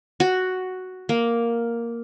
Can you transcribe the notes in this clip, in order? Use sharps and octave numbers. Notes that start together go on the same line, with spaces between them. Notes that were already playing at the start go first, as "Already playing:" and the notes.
F#4
A#3